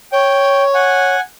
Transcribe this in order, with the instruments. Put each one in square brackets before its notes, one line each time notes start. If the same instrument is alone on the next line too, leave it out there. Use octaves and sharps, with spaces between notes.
[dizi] C#5 [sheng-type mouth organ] G5
[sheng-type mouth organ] F#5 G#5